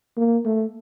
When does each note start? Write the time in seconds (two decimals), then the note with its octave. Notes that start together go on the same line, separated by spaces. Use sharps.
0.17 A#3
0.45 A3